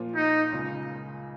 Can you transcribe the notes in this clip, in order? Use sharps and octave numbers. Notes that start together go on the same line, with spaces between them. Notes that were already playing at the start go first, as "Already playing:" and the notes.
Already playing: A#2 F3 A#3 F4
D#4
C#2 C#3 A#3 F4